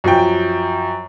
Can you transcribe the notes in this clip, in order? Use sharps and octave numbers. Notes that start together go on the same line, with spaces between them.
F#2 F3 G5